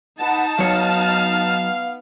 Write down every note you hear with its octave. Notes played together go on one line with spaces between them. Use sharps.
D#4 B4 F#5 A5
F#3 B3 C#5 F5 F6